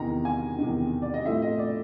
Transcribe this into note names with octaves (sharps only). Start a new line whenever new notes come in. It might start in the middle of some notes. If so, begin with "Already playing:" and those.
Already playing: E2 C3 D#3 A#5
G#5
E2 C3 D#3
D5
D#5
A2 F3 A3 C4 E5
D#5
D5